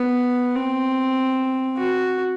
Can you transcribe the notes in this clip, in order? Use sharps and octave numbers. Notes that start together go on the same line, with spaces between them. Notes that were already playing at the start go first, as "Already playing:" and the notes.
Already playing: B3
C4
F#4